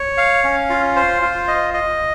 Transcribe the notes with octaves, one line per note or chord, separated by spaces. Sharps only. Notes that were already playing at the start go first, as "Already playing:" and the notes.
Already playing: C#5
F5
C#4
F4
C5
F4
D#5
D#5